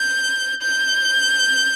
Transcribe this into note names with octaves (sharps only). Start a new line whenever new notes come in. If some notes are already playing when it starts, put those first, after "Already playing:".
Already playing: G6
G6